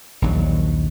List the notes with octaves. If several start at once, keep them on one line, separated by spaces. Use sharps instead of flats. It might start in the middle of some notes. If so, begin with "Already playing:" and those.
A#1 D#2 F#3